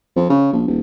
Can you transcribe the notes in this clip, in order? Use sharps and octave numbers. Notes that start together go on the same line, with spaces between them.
F2
C#3
A#1
D#1